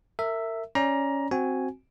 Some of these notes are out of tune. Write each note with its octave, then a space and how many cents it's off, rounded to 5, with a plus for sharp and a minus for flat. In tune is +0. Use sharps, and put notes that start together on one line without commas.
A#4 -35 E5 +0
C#4 +0 D5 +0 A#5 +15
C4 +0 F#4 +0 G#5 +0